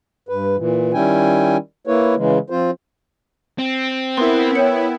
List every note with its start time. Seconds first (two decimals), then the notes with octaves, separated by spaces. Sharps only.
0.29 G2 B4
0.57 A#2 E3
0.93 D#3 G3 C#4 E4 G5 G#5
1.87 A#3 E4 B4 C#5
2.16 C#3 E3 G#3
2.50 F3 C4 F4 C5
3.59 C4
4.17 B3 E4 A#4 C6
4.55 C#5 G5 G6 C#7